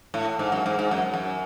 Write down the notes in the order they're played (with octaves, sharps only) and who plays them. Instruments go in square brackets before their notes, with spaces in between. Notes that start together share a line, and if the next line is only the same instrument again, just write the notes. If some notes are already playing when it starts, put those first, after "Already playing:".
[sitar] A2
G#2
F#2
G#2
G#2
F#2
F#2